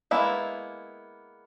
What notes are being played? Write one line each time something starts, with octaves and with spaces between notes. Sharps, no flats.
G#3 A#3 B3 E4